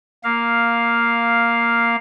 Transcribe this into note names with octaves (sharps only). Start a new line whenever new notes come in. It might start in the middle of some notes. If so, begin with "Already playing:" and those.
A#3 F5